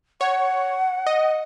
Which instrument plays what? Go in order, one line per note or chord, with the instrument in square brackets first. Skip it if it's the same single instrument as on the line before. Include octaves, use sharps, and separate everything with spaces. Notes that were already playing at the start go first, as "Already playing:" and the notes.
[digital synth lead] C#5 [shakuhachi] F#5
[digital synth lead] D#5